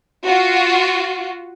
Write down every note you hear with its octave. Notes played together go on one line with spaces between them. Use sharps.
F4 F#4